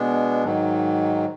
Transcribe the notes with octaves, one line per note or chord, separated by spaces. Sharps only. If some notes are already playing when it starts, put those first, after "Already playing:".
Already playing: B2 G#3 B3 D4
G#2 D#3 F#3